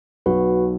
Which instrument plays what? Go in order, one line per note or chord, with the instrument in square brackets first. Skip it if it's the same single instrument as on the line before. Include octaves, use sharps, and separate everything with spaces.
[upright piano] B1 [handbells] F#4 B4